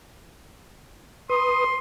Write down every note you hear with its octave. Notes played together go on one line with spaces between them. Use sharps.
B4 C6 D#6